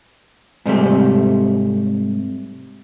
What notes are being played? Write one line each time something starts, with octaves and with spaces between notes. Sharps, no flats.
G#2 C3 G3 A3